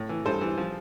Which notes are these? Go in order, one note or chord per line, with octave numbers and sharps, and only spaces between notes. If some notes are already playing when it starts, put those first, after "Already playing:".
Already playing: A2
E3
G2 A4 C5
E3
F3